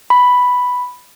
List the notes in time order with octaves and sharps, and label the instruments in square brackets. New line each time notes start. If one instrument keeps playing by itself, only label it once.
[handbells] B5